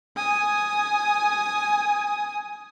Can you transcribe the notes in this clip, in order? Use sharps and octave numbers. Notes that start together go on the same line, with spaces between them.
G#5 D#6